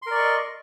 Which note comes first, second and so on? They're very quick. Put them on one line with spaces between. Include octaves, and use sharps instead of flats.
C6 A#4 D5 C#6 D#5